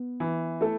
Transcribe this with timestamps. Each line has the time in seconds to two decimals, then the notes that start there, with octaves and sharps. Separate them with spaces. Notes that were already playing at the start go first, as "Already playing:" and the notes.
Already playing: B3
0.20 E3
0.61 A3 E4 A4